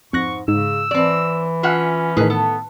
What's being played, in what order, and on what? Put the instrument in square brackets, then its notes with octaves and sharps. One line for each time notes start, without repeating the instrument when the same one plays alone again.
[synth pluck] F2 F#6 A#6 [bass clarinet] G#2 [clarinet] C#6
[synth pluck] G#2 [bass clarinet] C#3 [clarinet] E6
[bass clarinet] E3 [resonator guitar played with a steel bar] C4 D5
[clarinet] C#4 [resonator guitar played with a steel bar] F4 E5 F#5
[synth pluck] A2 D#3 [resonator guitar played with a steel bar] G#4 B4
[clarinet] B3 [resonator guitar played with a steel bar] A4